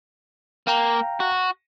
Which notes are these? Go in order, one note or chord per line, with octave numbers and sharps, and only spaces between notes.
A#3 F5 G5 A#5
F#4